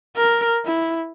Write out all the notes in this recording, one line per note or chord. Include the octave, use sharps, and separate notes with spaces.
A#4
E4